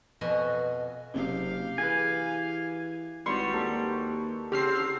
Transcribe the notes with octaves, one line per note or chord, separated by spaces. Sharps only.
F2 B2 F#4 D#5 G#5
F#1 C3 G4 F5
E3 G#4 B4 G#5
G#1 G3 E4 F#4 B4 D5 C6 C#6
D#2 A4 A#4
C#3 C4 G4 F6 C7